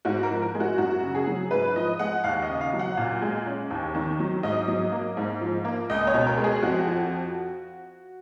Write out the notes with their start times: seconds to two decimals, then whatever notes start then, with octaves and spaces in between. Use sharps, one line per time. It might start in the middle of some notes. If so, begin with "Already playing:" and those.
0.05 G#2 F#4
0.23 A#4
0.30 F3
0.42 A#4
0.55 G#3
0.60 F#4
0.78 F#2 F#4
1.03 C#3
1.15 G#4
1.27 F#3
1.51 G#2 B4
1.76 F3 D#5
1.99 G#3 F#5
2.24 D#2 F5
2.42 D#5
2.49 C#3
2.61 F5
2.73 F#3
2.79 F#5
2.97 A#2 F5
3.22 G#3
3.47 C#4
3.71 D#2
3.95 D#3
4.20 F#3
4.43 G#2 D#5
4.68 F#3
4.92 A#3
5.17 G#2
5.41 F3
5.65 A#3
5.90 C#2 D#5
6.07 C#5
6.14 B2
6.26 A#4
6.38 G#3
6.44 G#4
6.62 F2 F#4
6.87 F3